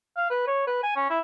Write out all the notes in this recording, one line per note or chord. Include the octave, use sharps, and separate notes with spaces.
F5
B4
C#5
B4
G#5
C#4
E4